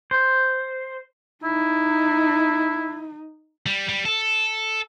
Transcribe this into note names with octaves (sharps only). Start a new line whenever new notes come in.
C5
D#4 E4
G3
G3
A4